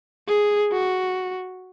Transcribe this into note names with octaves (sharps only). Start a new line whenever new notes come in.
G#4
F#4